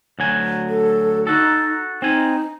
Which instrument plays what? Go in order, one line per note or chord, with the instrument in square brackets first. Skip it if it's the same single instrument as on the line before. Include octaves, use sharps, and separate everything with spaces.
[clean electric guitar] D2 F#3 G#5
[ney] A4
[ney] D#4 [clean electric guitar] F#4 A4
[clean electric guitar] C4 G#5 [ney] D#4